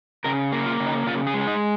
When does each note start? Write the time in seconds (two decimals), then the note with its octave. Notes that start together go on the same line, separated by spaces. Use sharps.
0.24 C#3 A#4
0.52 A#3
0.66 F4
0.80 C#3
0.86 D#4
1.06 C#3 F4
1.27 G#4
1.34 G#3
1.40 C#4
1.47 D#4